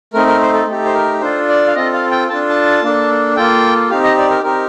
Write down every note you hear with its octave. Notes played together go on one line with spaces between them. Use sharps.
A3 C4 D#4 A#4
A#4
C5
A4
A3 D#4 G4 A4
C5
A#4
D4 F4 A4 C5
D5
F5
C4 F4 A4 D#5
F5
G5
D4 F4 A4 A5
A5
A#3 D4 A4
A#3 F4 A4 G5
C4 D#4 G4 F5
D#5
D5
A#4
C4 D#4 G4 A#4